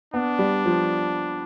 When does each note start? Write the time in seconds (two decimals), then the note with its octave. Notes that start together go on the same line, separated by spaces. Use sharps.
0.14 B3 D4
0.39 G3
0.66 F3